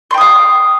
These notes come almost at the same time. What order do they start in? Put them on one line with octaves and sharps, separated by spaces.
C6 G5 D#6 F5